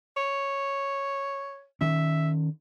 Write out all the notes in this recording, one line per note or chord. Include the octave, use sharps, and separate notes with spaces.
C#5
D#3 C#4 E5